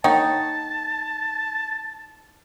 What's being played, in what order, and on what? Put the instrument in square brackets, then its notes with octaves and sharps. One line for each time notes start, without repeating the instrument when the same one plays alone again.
[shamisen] A#3 C#5 F#5 [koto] D#4 [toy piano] G5 [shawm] A5